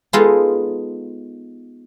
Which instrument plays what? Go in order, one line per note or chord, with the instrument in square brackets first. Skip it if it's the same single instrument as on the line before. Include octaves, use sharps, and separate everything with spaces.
[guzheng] G#3 B3 D#4 F4 A4